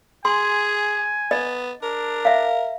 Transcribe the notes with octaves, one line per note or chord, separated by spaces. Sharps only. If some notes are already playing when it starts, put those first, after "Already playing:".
G#4 G#5 C6
B3 D#5
D4 A#4
E5 F5